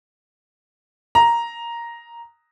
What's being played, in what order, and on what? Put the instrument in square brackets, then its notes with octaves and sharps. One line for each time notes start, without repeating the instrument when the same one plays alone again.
[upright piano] A#5